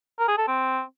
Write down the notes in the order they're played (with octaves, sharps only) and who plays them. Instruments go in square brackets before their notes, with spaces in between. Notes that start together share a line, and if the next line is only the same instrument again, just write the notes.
[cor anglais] A#4
G#4
A4
C4